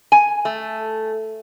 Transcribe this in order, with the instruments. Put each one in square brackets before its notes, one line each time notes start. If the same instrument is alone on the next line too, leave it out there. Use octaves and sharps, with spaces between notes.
[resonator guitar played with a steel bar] G#5
A3